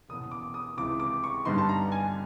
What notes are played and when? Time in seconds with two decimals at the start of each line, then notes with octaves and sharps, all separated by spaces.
0.09 F#1 E2 B2 D#6
0.31 D6
0.54 D#6
0.77 C#2 C3 E3 G#3 D6
1.00 D6
1.24 C#6
1.45 G2 D3 G3 B3 D#4 C6
1.58 A5
1.69 A#5
1.92 G#5